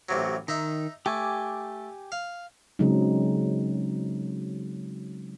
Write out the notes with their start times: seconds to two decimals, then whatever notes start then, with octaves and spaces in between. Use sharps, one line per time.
0.09 A1 C3 F#3
0.48 D#3 D#4 E5
1.06 A3 G4 G#5 D6
2.12 F5
2.79 C#3 F#3 G#3 C4 D#4